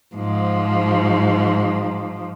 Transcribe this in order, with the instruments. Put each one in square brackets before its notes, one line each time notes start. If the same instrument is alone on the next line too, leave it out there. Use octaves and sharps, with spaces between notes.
[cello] G#2 F3